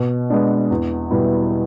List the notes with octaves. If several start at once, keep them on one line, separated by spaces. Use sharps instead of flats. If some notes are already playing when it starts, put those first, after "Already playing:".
Already playing: B2
G#3 B3 D4
E2
B2 G3 B3 E4